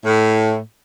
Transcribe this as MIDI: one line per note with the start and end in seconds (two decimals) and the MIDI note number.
0.05 0.58 45